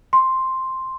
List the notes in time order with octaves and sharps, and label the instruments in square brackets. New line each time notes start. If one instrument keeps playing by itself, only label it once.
[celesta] C6